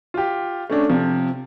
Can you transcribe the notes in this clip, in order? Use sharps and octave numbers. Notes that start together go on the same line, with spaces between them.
F4 G4
A3 C#4 D4
C3 F3